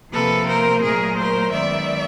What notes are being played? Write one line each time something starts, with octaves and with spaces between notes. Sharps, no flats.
C3 F3 A#3 A4 B4
A#4 C5
A#2 F#3 A3 G#4 A#4
A#4 C5
F#2 D#3 G#3 B3 D5 E5